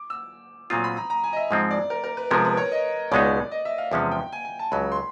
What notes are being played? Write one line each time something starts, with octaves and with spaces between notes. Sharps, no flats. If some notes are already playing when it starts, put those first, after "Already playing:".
Already playing: D6
E6
A#2 F#3 A3 C4 F4 D#6
B5
A#5
A#5
G#5
D#5
E5
G#2 F3 G#3 C4
D5
A#4
A#4
B4
C3 F3 G#3 B3 A#4
B4
C#5
D#5
C#2 B2 G#3 B3 D#4 D5
D#5
E5
F5
E2 C3 F3 G#3 C#4
G5
G#5
G#5
A5
C#2 C#3 F#3 B5
C6